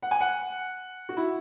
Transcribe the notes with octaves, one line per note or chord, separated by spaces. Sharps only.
F#5
G#5
F#5
F#4
E4